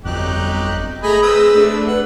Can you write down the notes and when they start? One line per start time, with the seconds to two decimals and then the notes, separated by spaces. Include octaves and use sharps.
0.05 G1 F2 F#3 D#4 G4 F#6
1.03 A3 G#4 D#5 G#5 A#5 B5
1.23 C4 B4 D#6 E6
1.54 A3 D4
1.87 B4 F#5